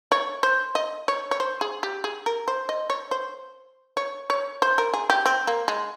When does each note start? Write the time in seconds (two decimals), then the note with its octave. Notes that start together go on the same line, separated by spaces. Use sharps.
0.12 C#5
0.43 C5
0.75 D#5
1.08 C#5
1.31 C#5
1.40 C5
1.61 G#4
1.83 G4
2.04 G#4
2.26 A#4
2.48 C5
2.69 D#5
2.90 C#5
3.11 C5
3.97 C#5
4.30 C#5
4.62 C5
4.78 A#4
4.94 G#4
5.10 G4
5.26 C4
5.47 A#3
5.68 G#3